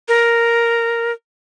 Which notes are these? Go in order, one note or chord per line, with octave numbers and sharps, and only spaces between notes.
A#4